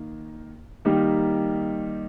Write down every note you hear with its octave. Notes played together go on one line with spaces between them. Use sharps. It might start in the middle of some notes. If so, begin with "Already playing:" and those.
Already playing: D#3 A#3
D#3 G3 A#3 D#4 G4